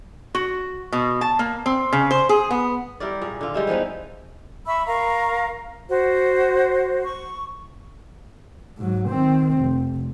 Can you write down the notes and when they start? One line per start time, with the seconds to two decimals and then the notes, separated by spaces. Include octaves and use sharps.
0.35 F#4
0.92 B2
1.21 A5
1.39 A#3
1.66 C4
1.93 C#3
2.11 C5
2.29 G#4
2.51 B3
3.00 G3 E4 A#4 D5
3.21 A#2 G#4
3.41 D3 F4
3.54 G3 G#3 E4
3.67 E3 F3 B3 D#4
4.66 E5 B5 C#6 E6
4.86 A#4 F5 A#5 C#6
5.89 F#4 C5
7.03 C#6
8.77 G#2 F#3
9.09 D#3 C4
9.59 F1